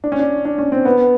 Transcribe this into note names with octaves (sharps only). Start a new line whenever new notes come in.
D4
C#4
D4
D4
C#4
C4
B3